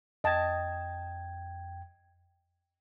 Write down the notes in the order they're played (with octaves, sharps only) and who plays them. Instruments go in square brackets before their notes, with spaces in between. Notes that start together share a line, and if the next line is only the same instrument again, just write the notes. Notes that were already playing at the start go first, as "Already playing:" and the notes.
[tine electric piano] F2 G5 G#6 [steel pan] D#5 A5